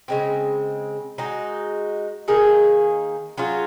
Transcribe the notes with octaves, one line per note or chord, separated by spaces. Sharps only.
C#3 G#3 C4
G#3 D#4 F#4
D#3 A#3 D#4 G#4
F#3 C#4 F4 G#4